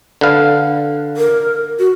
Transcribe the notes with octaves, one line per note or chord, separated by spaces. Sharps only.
D3 B4 F5
A#4
F#4